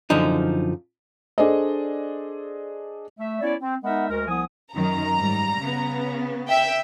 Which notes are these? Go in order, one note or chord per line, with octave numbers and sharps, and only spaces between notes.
F#2 D3 F3 D#4
D4 G#4 A4 C5 D5 D#5
A3 E5
B3 C#4 E4 C#5 D5
C4
G#3 B3 D#4 A#4 E5 F#5
D2 G#3 A3 A#4
C2 F3 B3 G#5 D#6
F#2 D#3 A#5
G#2 G3
C#3 B3
E5 G5